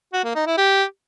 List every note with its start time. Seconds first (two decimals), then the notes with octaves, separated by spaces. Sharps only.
0.13 F#4
0.24 A#3
0.35 D#4
0.46 E4
0.57 G4